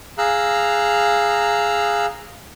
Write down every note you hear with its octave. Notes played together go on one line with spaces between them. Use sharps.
G#4 F5 A#5 E6 F#6